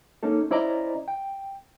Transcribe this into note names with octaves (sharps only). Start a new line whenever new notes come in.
A#3 C#4 D#4 A4
C#4 E4 C5 D5 D#5 A#5
G5